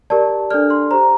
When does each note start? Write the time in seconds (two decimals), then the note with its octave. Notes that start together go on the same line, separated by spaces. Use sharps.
0.10 G4 A#4 D5 A5
0.51 D4 A4 D5 F6
0.70 C6
0.91 G4 C5 A#5